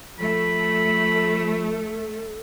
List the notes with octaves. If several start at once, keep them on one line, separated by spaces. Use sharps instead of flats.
F3 A3 A4 B5